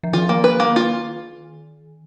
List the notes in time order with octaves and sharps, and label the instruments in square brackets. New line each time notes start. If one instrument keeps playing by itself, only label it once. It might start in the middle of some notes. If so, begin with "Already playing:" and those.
[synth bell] F3
[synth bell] D#3 [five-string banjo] F4
[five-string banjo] A#3
B4
A#3
F4